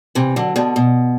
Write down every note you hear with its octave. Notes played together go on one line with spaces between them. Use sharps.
C3 E3
D3 F#3
B2 D3
B2